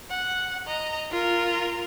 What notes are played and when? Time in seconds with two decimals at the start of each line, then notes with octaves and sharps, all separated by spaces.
0.10 F#5
0.67 D#5 A#5
1.11 F4 A#4